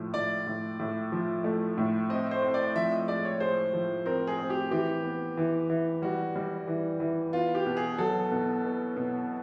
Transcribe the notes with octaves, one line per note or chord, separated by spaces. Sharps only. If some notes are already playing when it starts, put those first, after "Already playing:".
Already playing: A2 F3
A2 D5
A2
A2
F3
A3
A2
C4 D#5
C5
C4
D5
F3 E5
D#5
G#3 D5
C#5
G#3 C5
F3
C4 A#4
G#4
C4
G4
E3 G4
B3
E3
E3
G3 F#4
G3
E3
E3
B3 F4
G4
B2
G#4
F#3 A4
B2
B3
B2